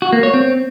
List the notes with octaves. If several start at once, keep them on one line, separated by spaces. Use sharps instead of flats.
F#4
A#3
C#5
C4